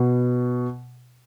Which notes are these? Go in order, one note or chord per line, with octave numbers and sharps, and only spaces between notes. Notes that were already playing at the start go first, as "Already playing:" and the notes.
Already playing: B2